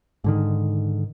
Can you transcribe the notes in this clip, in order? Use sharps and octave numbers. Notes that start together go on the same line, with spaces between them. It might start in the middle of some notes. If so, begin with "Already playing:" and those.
G#2 D3 D#3